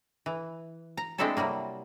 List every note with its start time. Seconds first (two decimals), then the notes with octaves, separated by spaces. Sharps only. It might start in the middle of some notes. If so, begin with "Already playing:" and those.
0.26 E3
0.97 A#5
1.18 G#3 A3 C4 D4 E4 A4
1.37 C3 F#3 G3 A#3